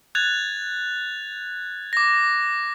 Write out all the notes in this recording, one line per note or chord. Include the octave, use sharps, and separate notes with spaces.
F#6 G#6 A6 F7
D6 A#6